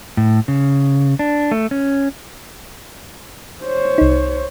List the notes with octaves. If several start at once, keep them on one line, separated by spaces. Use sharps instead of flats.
A2
C#3
D4
A3
C#4
C5 C#5
C2 D#4